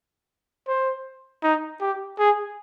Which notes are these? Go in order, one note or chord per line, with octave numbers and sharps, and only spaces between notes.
C5
D#4
G4
G#4